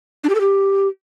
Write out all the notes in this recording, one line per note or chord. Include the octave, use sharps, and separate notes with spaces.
D4
G4
A4
G4